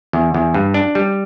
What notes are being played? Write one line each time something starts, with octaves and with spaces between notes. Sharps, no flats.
E2
E2
G2
D4
G3